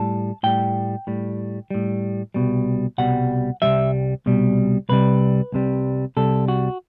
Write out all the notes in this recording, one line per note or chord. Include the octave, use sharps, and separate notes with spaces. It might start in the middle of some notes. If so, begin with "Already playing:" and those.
Already playing: A2 G3 A5
A2 G3 G5
A2 G3
A2 G3
C2 B2 G3
C2 B2 G3 F#5
C2 B2 G3 E5
C2 B2 G3
C2 C3 G3 B4
C2 C3 G3
C2 C3 G3 A4
F#4